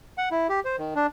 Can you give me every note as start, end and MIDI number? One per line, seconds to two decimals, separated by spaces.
0.18 0.29 78
0.31 0.47 64
0.49 0.60 67
0.65 0.76 72
0.78 0.94 51
0.95 1.07 62